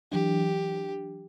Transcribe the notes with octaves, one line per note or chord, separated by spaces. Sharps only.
E3 F#3 D4 G4